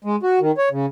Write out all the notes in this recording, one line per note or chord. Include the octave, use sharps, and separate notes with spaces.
G#3
F#4
D#3
C#5
C#3